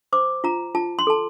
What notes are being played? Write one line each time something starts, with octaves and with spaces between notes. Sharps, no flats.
C5 D6
F4 A#5
F4 A5
C6
A4 A5